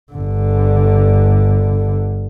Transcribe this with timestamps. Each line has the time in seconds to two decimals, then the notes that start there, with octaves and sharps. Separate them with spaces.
0.13 G1 D3